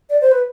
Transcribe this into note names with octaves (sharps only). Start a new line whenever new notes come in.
D5
C5
B4